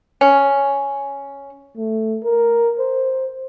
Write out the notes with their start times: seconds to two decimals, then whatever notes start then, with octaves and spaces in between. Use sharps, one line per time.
0.21 C#4
1.77 A3
2.24 A#4
2.80 C5